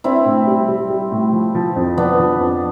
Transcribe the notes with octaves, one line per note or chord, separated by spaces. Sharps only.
C4 D4 E4
A2
G3
G3
G3
A2
F3
F3
F2
F3 B3 D4
F3
F2